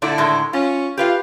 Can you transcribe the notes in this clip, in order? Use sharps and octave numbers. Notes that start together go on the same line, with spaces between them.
A#2 D3 A3 E4 D5
A2 D#3 G#3
C#4 F4
F4 G4 B4 F5